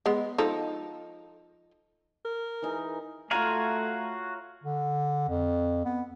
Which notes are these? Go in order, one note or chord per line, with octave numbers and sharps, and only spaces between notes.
G#3 B3
F3 D#4 A4
A#4
E3 D#4 G#4
A3 F4 F#4 C#5 F5 G#5 A#5
D3
F2
B3